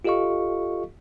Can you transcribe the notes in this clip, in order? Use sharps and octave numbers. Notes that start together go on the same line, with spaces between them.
F4 G4 A4 D#5 F5 C#6